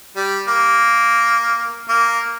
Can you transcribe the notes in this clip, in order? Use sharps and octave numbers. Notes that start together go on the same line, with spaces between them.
G3
A#3
A#3